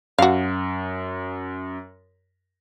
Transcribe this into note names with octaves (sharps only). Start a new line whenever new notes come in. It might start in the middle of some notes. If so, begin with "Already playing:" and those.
F#2 F#4 F5